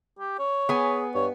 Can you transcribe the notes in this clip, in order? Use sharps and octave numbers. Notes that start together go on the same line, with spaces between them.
G4
C#5
B3 G#4 G#5
G2 C#5